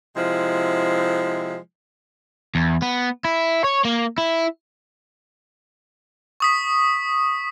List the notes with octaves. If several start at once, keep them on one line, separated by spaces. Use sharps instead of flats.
C3 F3 G#3 E4
E2
B3
E4
C#5
A#3
E4
C#6 D#6 B6